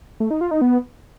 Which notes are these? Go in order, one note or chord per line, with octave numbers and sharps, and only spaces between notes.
A3
D#4
F4
D#4
B3